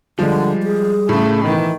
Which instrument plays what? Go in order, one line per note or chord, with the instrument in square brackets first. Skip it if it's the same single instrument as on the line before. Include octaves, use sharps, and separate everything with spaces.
[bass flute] D3 [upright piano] F3 G#3 [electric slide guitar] G3
[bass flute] G#4
[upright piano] A2 C#3 [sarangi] A3
[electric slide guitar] B2 [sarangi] D#3 [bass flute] E3